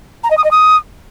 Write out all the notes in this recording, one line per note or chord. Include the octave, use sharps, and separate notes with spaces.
A#5
D#5
D#6
D#5
D#6